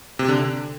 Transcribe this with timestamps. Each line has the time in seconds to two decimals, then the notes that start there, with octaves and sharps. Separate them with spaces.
0.19 C3
0.28 D3